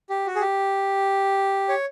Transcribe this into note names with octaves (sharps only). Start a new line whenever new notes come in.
G4
F#4
G#4
G4
C#5